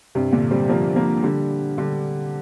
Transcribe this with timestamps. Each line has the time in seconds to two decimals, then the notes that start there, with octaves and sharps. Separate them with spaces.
0.15 G2 C3
0.32 A#2 D3
0.51 G3 C4
0.69 F3 A#3
0.96 F3 A#3
1.23 D3 G3
1.78 D3 G3